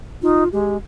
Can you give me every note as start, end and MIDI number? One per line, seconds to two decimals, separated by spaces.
0.22 0.44 63
0.22 0.48 65
0.52 0.77 56
0.52 0.76 67